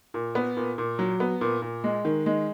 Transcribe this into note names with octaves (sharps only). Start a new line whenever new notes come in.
A#2
B3
A#2
A#2
F#3
B3
A#2
A#2
G#3
D#3
G#3